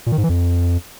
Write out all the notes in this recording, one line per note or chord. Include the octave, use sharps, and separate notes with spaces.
A#2
D#3
G#2
E3
F2